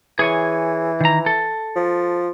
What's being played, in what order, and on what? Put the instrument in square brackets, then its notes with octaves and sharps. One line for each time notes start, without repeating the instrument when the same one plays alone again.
[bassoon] E3 [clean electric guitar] G#4 C#5 G#5
[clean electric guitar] D#3 A#5
A4
[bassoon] F3